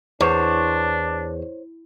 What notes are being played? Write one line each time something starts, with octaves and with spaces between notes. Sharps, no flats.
E2 D4 C5 C#5